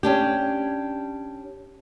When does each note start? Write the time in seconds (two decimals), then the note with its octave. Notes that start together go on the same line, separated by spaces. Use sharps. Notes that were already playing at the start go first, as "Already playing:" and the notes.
0.03 C#4 D4 G4